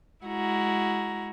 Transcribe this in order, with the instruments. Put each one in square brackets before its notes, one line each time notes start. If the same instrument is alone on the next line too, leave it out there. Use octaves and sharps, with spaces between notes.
[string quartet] G#3 E4 F#4 A#5